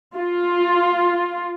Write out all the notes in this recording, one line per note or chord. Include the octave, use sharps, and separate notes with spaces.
F4